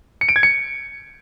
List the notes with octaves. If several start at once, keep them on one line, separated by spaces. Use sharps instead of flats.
C#7
D7
G#6
C#7